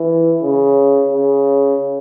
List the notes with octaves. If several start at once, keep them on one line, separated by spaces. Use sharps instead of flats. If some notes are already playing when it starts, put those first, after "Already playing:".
Already playing: E3
C#3
C#3